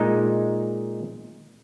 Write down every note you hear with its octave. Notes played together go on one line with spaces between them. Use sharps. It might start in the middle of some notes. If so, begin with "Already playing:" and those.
Already playing: A#2 G#3 D#4